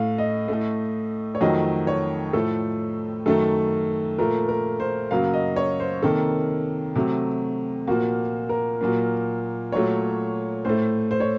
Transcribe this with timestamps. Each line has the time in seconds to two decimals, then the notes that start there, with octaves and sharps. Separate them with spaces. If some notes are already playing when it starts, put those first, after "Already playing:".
Already playing: A2 A3 F5
0.18 D#5
0.48 A2 A3
1.35 C#5
1.41 F2 D#3 F#3 A3 D#5
1.87 C#5
2.33 A2 F3 A3 A4
3.26 F#2 D#3 A3 A4
4.18 A#2 F3 A3 A#4
4.49 A#4
4.80 C5
5.11 F#2 C#3 F#3 A#3 F5
5.33 D#5
5.56 C#5
5.80 C5
6.03 C3 D#3 A#3 A4
6.96 C3 F#3 A3
7.88 A#2 F3 A#3 F#4
8.49 A#4
8.81 A#2 F#3 A#3
9.72 A#2 F#3 A3 C#5
10.65 A2 A3 C5
11.11 C5
11.20 C#5